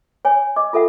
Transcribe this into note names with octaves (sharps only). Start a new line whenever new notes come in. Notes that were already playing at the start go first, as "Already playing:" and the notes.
C#5 G#5
D#5 D6
F4 A4 E5 F#5